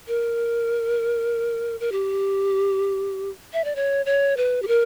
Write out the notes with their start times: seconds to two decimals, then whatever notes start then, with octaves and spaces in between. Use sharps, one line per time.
0.07 A#4
1.80 A#4
1.92 G4
3.53 E5
3.65 D5
3.76 C#5
4.06 C#5
4.37 B4
4.62 G4
4.68 A#4